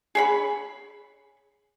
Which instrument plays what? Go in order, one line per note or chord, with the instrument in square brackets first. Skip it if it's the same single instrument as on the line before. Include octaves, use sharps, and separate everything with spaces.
[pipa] G#4 C#5 B5